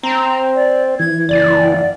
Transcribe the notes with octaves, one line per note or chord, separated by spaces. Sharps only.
C4 A#5
D5
E3 G#6
F#1 D5